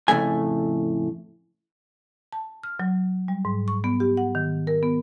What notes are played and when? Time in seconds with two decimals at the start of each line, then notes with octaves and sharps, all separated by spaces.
0.08 F2 A2 C#3 A3 G#5
2.32 A5
2.63 F6
2.80 F#3
3.28 G3
3.45 G#2
3.68 C#6
3.84 B3
4.00 G4
4.17 F#5
4.35 D#3
4.67 A#4
4.83 B3